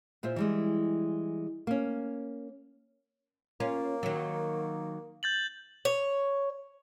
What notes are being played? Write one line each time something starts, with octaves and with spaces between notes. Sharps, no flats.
A#2 F4 C5 E5
E3 G3 G#3
A#3 C#4
A#3 C#4 F4
D#3 F#3
G6 A6 F#7
C#5